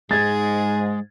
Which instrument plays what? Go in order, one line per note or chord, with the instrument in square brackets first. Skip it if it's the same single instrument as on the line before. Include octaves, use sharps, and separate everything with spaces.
[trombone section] G#2 [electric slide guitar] G#3 [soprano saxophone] G#4 [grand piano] G#6 A6